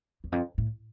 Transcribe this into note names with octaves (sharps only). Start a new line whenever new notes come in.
E2
F2
A2